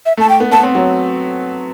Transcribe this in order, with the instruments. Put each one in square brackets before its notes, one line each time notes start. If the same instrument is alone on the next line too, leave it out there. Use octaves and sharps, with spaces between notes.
[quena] E5
[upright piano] A3 [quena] A5
[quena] G5
[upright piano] B3
[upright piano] B3 [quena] A5
[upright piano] C4
F#3